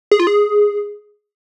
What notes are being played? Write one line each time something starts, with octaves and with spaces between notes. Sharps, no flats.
G#4
F4
G#4